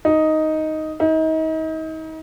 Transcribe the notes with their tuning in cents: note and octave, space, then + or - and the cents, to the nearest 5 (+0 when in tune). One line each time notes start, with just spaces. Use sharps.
D#4 +5
D#4 +35